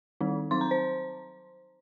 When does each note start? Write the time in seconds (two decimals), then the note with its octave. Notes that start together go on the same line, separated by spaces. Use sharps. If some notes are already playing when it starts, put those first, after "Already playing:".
0.21 D#3 G3 C4 D#4
0.51 F#3 C4 D#4 C6
0.61 A#5
0.71 C5